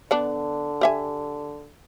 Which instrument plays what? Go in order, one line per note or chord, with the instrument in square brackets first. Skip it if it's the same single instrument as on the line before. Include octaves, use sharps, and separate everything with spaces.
[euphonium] D3 [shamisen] B3 D4
[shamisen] G4 E5 G#5